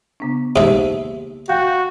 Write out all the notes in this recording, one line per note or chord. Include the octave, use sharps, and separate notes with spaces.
C#3 B3 D4
G#2 A#3 G4 E5
F#4 F5 G5 G6